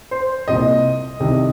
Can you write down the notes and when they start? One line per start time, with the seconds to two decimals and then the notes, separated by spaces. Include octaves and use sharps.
0.11 C5
0.48 C2 A#2 D#5
1.20 C2 C3 D#3